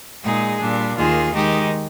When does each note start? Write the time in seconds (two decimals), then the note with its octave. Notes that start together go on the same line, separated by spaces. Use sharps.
0.22 A#2 G#3 D#4 G#4
0.59 A#2 G3 D4
0.95 D#2 D#3 A#3 F4 G#4
1.31 D#3 G#3 D#4 G4